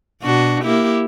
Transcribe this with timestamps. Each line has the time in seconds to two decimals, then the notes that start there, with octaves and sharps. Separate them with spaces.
0.22 B2 D4 F#4
0.64 A#3 E4 G4